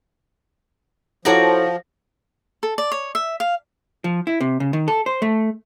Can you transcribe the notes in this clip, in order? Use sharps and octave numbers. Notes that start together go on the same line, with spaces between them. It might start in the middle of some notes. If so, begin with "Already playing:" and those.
F3 E4 F#4 A4 C#5 D5 A#5
A4
D5
C#5
E5
F5
F3
E4
C3
C#3
D#3
A4
C5
A3